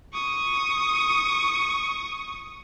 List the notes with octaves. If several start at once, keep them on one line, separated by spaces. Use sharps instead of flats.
C#6 D#6